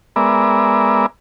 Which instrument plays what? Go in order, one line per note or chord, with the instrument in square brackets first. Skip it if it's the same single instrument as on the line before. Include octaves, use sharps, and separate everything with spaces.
[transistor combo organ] G#3 B3 A#4 D5 E5